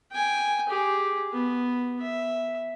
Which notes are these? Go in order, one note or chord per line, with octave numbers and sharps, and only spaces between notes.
G5 G#5
G4 G#4
B3
E5